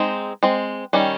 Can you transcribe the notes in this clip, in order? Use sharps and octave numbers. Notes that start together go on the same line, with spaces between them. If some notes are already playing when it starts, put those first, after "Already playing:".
Already playing: G#3 C4 D#4
G#3 C4
D#3 G3 C#4